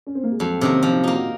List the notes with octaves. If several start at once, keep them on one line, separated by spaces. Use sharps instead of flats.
C#4
C4
A#3
G#3
F2 F#3
F#3
C3 D#3 A#3 C#4
C4
F3 C4
D#4
A#3 D#4 F4
F#4